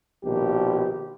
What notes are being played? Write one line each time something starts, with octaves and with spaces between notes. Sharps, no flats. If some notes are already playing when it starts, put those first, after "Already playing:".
A#1 B2 D#3 G4